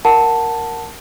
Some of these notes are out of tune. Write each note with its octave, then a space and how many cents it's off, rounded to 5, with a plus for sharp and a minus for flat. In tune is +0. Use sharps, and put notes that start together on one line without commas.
A#4 +0 F#5 +0 A5 +5